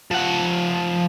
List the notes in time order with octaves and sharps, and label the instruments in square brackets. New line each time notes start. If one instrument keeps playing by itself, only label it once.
[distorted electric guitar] F3 F#5